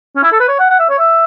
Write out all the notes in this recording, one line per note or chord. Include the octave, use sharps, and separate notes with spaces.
C#4
E4
A4
B4
C#5
F#5
F#5
E5
C#5
E5